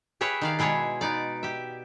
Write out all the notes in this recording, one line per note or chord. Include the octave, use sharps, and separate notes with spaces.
G4 G#4 B4 C#5 E5
D#3 D5 F5
B2 G#3 E4 G#4 C#5
B3 D#4 D5
G4 E5